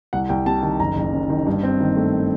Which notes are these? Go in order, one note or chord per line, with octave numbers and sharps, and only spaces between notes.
C2 F#5
C2 G5
C3 A5
D#3 A5
F#1 A#5
F#1
F#2
D#3
G2
C4
D#3
A3